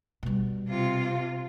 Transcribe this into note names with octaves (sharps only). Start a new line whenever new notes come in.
B2 G3
C3 F4